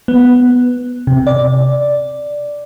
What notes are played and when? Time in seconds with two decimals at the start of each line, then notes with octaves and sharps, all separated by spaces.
0.08 B3
1.07 C3
1.27 D5